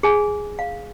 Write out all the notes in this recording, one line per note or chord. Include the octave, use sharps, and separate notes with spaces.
G#4 G#5
F5